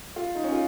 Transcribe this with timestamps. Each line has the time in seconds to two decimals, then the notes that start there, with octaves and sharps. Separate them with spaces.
0.16 F4
0.35 D#4
0.43 C#4
0.52 F4